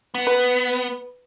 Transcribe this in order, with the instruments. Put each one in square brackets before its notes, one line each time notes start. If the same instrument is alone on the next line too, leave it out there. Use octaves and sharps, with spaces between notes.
[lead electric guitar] B3
[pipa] B4